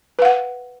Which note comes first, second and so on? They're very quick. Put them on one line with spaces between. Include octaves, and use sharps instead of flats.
B4 F5 F#5